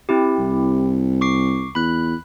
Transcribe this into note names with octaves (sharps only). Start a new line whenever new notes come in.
C4 E4 G4
C2
C#6 D6 C7
E2 B5 F#6